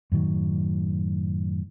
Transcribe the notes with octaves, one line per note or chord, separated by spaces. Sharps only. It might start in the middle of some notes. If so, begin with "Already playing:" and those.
F#2 A2 D#3 F#3